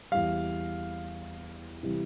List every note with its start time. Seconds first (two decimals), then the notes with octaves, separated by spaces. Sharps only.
0.12 E2 E3 G3 F5
1.83 C3 E3 G3